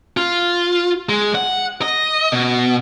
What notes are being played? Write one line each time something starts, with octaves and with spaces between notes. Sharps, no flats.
F4
G#3
F#5
D#5
B2